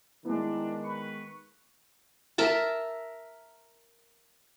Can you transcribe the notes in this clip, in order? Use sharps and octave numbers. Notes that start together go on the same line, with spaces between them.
D#3 G#3 B3 D4 E4
B4 C#6
A#4 E5 A5